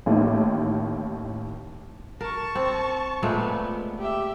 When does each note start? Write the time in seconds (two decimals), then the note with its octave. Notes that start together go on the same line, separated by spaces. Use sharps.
0.06 A1 D#2 A2 D#3
2.21 A#4 A5 C#6
2.55 C4
3.23 A#2 G#3 A3 B3
3.98 G4 E5